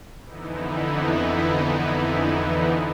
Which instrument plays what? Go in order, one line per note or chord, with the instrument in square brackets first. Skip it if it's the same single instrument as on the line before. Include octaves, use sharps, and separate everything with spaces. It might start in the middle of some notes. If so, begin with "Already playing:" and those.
[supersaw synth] F2 D3 E3 B3 D#4 E4